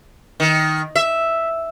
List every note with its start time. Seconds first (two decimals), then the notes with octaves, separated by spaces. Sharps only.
0.40 D#3
0.96 E5